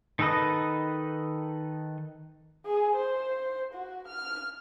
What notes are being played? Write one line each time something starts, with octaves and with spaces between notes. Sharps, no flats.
D#3 D#4 A4 B4 D#5
G#4
C5
F#4
F6